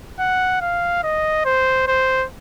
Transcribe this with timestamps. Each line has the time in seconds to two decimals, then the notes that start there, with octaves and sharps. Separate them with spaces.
0.19 F#5
0.61 F5
1.03 D#5
1.45 C5
1.87 C5